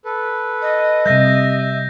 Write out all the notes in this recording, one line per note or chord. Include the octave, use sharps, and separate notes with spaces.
A4 B4
D#5
C3 G3 E5 G6 A#6